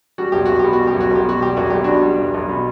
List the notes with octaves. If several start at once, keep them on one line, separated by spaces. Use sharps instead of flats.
G3 F#4
B1 G4
B1 F#4
G4
B2
F#4
G3
G4
B1
F#4
B1 G4
B2 F#4
G3 G4
B1 F#4
B1 G4
B2 D4 F#4
G3
B1
B1
B2